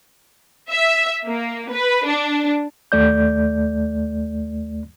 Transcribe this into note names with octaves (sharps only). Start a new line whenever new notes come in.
E5
A#3
B4
D4
D#2 A3 D5 G6